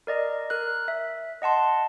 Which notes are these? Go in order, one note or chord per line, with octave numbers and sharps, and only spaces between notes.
A#4 D5 D#5
A#4 F#6
E5
D#5 F#5 A5 C6